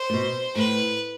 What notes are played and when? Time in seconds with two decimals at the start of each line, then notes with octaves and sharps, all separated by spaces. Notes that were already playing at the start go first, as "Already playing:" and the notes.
Already playing: C5
0.10 A#2
0.14 B2
0.55 A2 B4